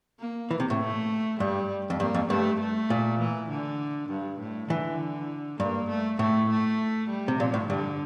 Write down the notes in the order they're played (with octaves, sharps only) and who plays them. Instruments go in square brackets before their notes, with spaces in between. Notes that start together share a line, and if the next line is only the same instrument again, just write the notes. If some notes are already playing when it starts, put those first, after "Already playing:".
[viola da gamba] A#3
[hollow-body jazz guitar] E3
C3
A2
[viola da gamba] A3
[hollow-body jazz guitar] G2 [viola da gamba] G3
[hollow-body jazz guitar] F2
[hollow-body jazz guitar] G2 [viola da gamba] A#3
[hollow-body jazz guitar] F2
[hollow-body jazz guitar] G2 [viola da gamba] A3
[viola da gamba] A3
[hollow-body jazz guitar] A#2
[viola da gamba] E3
D3
G2
A2
[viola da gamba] D3 [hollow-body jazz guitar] E3
[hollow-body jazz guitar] G2 [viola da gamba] A#3
[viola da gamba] A3
[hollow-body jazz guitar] A2 [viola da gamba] A3
[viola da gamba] A3
G3
[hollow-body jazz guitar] C3
[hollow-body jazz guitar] A#2 [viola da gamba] F3
[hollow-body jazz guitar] A2
[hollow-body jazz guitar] G2 [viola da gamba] D3